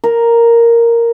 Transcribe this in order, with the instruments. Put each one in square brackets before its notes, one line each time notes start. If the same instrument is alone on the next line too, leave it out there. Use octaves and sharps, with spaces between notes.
[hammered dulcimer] A#4